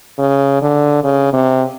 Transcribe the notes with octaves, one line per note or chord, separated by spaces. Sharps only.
C#3
D3
C#3
C3